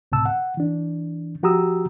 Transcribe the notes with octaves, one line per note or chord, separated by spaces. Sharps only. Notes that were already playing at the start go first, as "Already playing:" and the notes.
C#2 A2 C3 A5 E6
F#5
E3 D4
F3 F#4 G4 A#5 D#6 E6